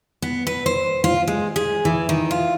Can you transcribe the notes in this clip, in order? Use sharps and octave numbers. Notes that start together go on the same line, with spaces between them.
B3
B4
C5
F4
G#3
G#4
E3
D#3
F4